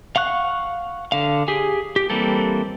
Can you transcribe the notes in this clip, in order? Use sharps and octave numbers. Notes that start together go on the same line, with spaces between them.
F5 F#5 C#6 F#6
D3 F5
G4 G#4 G#5
G4
E3 G3 A#3 C4 A4